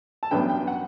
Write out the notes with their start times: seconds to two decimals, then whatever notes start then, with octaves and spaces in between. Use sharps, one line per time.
0.23 A5
0.31 A1 G2 F#3 B3 G5
0.50 G5
0.67 F#5